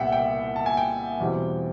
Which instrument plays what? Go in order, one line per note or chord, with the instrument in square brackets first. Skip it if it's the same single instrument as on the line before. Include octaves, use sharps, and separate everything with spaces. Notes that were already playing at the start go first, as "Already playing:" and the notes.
Already playing: [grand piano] C2 A#2 G3 B3 E5 F#5 G5
G5
A5
G#5
G5
E2 B2 G3 C4